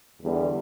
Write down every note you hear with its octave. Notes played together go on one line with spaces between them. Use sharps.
E2 D3 G3